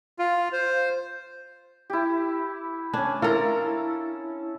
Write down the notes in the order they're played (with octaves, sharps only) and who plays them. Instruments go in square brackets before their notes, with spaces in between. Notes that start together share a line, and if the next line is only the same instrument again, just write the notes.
[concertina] F4
C5
[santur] E4 G4
[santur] C#4 G#5 [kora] D4
[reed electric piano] E4 [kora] F4 A#4 [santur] A4